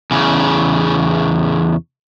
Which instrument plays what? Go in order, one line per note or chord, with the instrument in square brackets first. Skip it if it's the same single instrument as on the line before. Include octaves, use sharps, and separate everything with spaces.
[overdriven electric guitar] E2 C#3